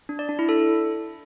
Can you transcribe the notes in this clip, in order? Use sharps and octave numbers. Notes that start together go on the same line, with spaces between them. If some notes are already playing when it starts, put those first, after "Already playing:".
D4
D5
D4
E4
A4